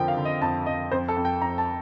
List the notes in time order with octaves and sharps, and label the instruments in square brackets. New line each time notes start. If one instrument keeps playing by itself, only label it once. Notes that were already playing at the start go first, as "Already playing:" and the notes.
Already playing: [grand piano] F2 D3 F3 A#4 G5
F5
D3
D#5
F2 A5
F2 D#5
F2 C5
A4
F2
G5
F2 A#5
A5